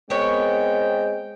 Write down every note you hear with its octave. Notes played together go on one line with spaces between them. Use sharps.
G#3 B3 C4 A#4 C#5 G5